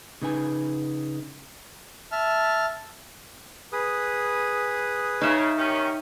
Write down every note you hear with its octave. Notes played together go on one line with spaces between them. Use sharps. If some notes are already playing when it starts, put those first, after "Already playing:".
C#3 D#4 B4 G#5
E5 A5 F6
G#4 B4 D#6
C#3 D#4 E5
D#3 C#4 G4 C#6 G6